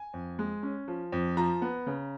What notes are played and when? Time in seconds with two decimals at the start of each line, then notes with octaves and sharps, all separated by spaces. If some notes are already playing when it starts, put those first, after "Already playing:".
Already playing: G#5
0.14 F2
0.39 G#3
0.63 C#4
0.88 F3
1.12 F2
1.37 F3 A#5
1.62 B3
1.87 C#3